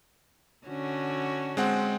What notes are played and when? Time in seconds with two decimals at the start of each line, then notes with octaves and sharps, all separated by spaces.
0.66 D3 C#4 F#4
1.57 G#3 C4 F#5